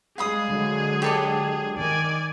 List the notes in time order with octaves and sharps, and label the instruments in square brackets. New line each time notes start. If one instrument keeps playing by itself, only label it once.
[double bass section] G3 G#3 [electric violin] G#4 [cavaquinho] F5 B5 D#6
[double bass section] D3 F#3 G#3
[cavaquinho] G4 A4 D6
[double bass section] D#3 [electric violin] D5 G#5